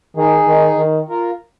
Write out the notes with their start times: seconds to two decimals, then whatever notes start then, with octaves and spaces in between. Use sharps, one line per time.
0.17 D#3 D#4 G#4
0.47 D#3
0.78 D#3
1.09 F4 A#4